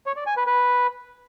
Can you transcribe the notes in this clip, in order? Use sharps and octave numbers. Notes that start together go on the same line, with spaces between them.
C#5
D5
G#5
B4
B4